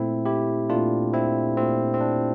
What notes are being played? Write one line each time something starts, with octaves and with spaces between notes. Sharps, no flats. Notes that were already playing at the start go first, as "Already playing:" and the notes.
Already playing: A#2 A3 C4 E4
E4 G4
A#2 A3 D4 F4
C4 E4
A#2 A3 C4
C4
D4